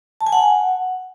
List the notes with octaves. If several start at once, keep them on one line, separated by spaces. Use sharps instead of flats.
A5
G#5
F#5